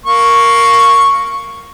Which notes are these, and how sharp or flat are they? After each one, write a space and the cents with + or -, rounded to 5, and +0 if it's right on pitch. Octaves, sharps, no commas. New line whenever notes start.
A#3 +0 C#6 +0